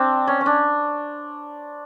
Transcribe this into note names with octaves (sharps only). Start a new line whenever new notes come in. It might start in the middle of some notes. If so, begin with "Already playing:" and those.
Already playing: C4 D4
C#4
C#4
D4